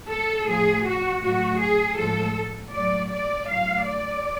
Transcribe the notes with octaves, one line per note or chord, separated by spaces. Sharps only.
A4
A2 F3 A3 G#4
F#4
A2 F#3 A3 F#4
G#4
A2 F3 G#3 A4
A2 F#3 A3 D5
D5
A2 F#3 A3 F5
D5